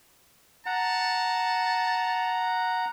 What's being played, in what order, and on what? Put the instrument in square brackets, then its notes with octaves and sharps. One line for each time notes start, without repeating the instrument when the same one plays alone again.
[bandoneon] F#5 A#5 [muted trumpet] A5